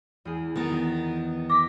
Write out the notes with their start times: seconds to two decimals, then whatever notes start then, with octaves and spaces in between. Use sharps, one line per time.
0.25 E2 G#4
0.56 D#3 B3 A#5 A6
1.50 D6 A#6 B6